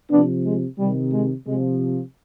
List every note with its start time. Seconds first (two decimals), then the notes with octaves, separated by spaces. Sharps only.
0.11 C3 F3 B3 D4
0.45 G#3
0.79 C3 D#3 G3
1.12 G#3
1.47 C3 F3 G#3